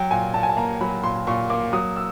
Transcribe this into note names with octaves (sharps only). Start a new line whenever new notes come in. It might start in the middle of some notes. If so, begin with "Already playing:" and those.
Already playing: F#3 G5
A#2 G#5
A#2 A5
G#5
A5
A#3 A#5
F#3 B5
A#2 C6
A#2 C#6
A#3 D6
F#3 D#6
E6